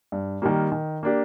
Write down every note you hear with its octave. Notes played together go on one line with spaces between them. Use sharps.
G2
D#3 G3 A#3
D#3
A#3 D4 G4